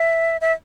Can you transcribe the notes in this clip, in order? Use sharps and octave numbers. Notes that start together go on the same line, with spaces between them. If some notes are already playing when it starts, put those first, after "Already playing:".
Already playing: E5
E5